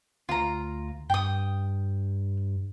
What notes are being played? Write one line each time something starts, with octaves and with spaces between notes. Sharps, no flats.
D2 F4 A#5
G2 G5 D#6